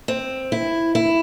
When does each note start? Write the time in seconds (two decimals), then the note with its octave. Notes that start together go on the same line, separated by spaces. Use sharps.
0.08 C4
0.52 E4
0.95 E4